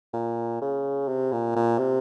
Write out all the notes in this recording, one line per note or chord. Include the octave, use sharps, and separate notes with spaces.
A#2
C#3
C3
A#2
A#2
C3